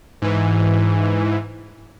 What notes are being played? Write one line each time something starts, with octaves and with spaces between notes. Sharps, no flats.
G#2 E3